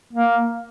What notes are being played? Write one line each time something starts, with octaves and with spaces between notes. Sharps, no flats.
A#3